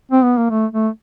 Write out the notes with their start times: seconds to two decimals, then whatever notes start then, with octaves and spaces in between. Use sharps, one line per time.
0.12 C4
0.24 B3
0.37 A#3
0.51 A3
0.73 A3